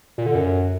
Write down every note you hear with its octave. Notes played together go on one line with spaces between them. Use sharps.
A#2
D3
F#2